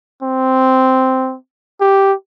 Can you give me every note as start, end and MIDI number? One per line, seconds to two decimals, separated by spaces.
0.23 1.36 60
1.81 2.14 67